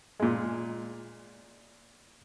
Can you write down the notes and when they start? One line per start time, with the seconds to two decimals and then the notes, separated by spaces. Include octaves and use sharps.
0.20 A#2 G#3